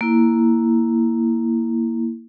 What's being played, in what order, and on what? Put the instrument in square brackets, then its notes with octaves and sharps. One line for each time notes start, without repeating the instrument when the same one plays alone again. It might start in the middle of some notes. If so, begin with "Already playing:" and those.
[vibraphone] A#3 E4